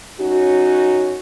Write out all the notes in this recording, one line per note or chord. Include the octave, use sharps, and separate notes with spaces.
F#2 C#4 D#4 F#4